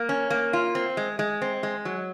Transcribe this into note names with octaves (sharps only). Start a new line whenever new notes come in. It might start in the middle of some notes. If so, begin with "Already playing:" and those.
Already playing: A#3
C#4
A#3
F4
C4
G#3
G#3
C4
G#3
F#3